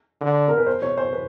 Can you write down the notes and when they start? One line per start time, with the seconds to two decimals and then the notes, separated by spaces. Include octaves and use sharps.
0.21 D3
0.48 A#4
0.58 B4
0.67 C5
0.82 C#5
0.98 C5
1.13 B4